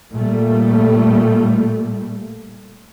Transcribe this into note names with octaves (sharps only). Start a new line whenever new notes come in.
A#2 G3 A3